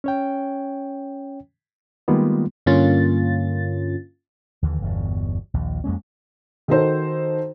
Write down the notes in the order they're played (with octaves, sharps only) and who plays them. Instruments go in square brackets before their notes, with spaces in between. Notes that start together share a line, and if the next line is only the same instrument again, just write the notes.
[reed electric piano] C#4 C#5 G5
D#3 G3 G#3 A#3 B3 F4
[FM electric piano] G2 D3 A#3 C#4 F4 A6
[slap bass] D#2 D3 E3
G1 E2 B2
A#1 D#2
F2 G#3 A#3 C#4
[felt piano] D#3 D#4 F#4 A4 C5